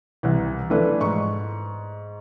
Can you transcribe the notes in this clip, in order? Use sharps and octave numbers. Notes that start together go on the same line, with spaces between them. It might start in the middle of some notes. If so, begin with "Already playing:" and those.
C2 E3
E3 F3 A3 D4 B4
G#2 C#6